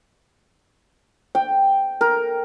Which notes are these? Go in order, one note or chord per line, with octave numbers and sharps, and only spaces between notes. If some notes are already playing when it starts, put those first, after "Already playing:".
G5
A#4